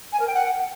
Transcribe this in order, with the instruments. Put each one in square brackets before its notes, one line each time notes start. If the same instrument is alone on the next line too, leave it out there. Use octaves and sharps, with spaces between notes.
[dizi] G#5
A#4
G5
F#5